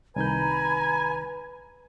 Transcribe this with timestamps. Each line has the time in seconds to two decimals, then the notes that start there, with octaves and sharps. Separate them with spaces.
0.16 C2 D#3 B4 G#5 A#5 B5 G6